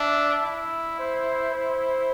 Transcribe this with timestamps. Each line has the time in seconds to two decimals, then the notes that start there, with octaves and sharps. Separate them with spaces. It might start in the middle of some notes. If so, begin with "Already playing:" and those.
Already playing: D4 E5
0.44 E4 E5
0.99 C5
1.55 C5